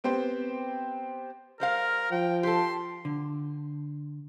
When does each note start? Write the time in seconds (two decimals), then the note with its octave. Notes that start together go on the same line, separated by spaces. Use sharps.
0.04 B3 C4 G4 C5
1.60 G3 A#4 C5 F5
2.12 F3 G5
2.43 G4 A4 C6
3.05 D3